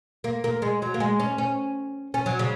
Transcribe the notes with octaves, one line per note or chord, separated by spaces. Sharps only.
A#3
A#3
G#3
F#3
A#3
G#3
C#4
C#4
C#4
F#3
C#3